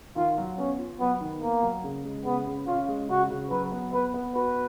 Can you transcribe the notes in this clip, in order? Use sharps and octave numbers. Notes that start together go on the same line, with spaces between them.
D#3 F4
F#3
B3 C#4
F4
F#3 B3
D#3
A#3 B3
F#3
C#3
G#3
C#3 B3
C#3
C#4 F4
G#3
C#3 F#4
C#3
F#3 B4
B3
B3 B4
B3
F#4 B4